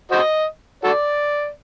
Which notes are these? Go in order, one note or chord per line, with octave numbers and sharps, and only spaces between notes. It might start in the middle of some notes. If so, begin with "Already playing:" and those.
F#4 C5 D#5
F#4 A4 D5